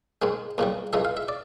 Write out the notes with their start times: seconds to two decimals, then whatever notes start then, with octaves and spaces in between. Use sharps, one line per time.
0.22 G#2 D#3 G#3
0.58 D#2 C#3 E3 G3
0.93 C#2 C#3 E3 G#3 E5
1.05 F5
1.17 E5
1.28 D5